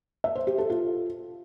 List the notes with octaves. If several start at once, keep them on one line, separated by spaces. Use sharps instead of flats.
E5
C5
G4
A4
F4